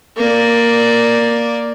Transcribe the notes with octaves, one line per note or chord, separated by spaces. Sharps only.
A#3 D5